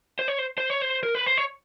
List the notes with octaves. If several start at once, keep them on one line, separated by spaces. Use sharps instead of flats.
C5
C#5
C5
C5
C#5
C5
A#4
B4
C5
C#5